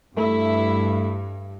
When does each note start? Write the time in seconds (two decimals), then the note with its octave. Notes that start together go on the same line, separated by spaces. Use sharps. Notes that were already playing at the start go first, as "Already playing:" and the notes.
0.17 G2 A3 E4 E5